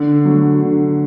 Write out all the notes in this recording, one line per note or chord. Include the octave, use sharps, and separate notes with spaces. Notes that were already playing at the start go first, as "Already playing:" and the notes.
Already playing: D3
F#3 A3
D3